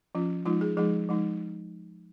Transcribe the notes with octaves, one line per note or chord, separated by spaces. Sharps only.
F3 C#4 F4
F3 G#3 D#4 F4
G#4
F3 G#3 D#4 G#4
F3 G#3 D#4